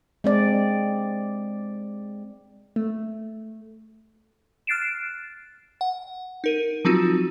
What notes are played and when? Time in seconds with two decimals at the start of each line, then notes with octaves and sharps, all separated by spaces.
0.24 G#3 C4 D5
2.76 A3
4.67 F6 F#6 A6 C7 D7 E7
5.81 F#5
6.44 D#4 A#4 D#7
6.85 F3 F#3 C4 D#4 F4 F#4